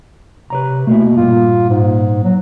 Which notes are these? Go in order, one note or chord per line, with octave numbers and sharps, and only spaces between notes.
C3 B4 C#5 A#5
B2 A3 A#3 E4
G2 A#2 F4
G#2
F#3